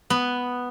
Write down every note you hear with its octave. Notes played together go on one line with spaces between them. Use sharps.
B3